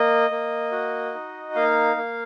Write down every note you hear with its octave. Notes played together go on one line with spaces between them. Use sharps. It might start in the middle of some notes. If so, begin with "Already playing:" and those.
Already playing: A#3 D#5
A#3
F#4
D#4
A#3 F5
A#3